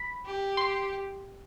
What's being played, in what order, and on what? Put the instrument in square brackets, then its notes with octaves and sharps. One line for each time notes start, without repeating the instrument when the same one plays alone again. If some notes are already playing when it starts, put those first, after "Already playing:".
Already playing: [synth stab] B5
[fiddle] G4
[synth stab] C6